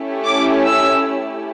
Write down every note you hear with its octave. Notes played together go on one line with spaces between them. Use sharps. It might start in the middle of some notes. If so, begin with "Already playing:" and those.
Already playing: A3 C#4 E4 G4
D6
E6